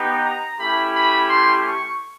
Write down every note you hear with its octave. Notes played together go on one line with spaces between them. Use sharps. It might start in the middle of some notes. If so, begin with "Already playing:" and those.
Already playing: B3 D#4 G4
A#5
A3 C#4 E4 G4 B5
B5
C6
C#6